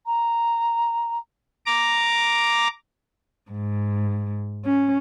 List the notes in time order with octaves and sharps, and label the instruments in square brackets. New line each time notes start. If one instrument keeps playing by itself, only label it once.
[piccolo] A#5
[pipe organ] A#5 D6
[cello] G#2
C#4